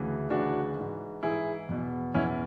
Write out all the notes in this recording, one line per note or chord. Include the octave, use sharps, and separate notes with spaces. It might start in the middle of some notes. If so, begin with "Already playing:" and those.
Already playing: D2 C#3 E3
D2 C#3 E3 D4 F#4
G#2 E3
G#2 E3 E4 G#4
E2 B2
E2 B2 C#4 E4